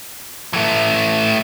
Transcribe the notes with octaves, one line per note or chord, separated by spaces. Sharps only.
E3 A3